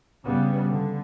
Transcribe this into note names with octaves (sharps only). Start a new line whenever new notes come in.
G2 C#3 G3 B3
D3